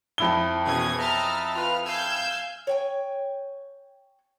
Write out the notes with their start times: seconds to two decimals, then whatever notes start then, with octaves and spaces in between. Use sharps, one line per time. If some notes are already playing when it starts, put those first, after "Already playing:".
0.18 F2 E4 G7
0.67 B2 E3 C#4 G#4 D#6 G#6
0.99 D#5 E5 A#5 F6 A6
1.55 F4 B4 F6
1.86 F5 G#5 E6 G6
2.67 C#5 G5 G#5